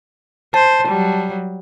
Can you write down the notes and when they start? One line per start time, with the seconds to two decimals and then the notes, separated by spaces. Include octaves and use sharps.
0.54 C5 A5
0.88 F#3 G3